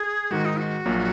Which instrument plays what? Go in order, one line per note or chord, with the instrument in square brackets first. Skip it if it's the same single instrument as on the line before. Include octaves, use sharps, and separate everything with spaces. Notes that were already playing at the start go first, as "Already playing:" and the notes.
Already playing: [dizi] G#4
[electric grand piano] G#2 D#3 G#3 [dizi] F#4
[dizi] D#4
F#4
[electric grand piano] A#1 A#2 F#3